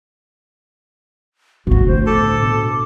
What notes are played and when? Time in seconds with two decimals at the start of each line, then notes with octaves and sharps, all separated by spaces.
1.67 G1 B2 C4 D4 F#4
1.88 A2 D3 C5
2.07 A4 D6
2.42 B2